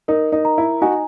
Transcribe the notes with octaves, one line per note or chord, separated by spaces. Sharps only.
D#4 A#4
D#4
A#5
E4
D#4 F#4 G#5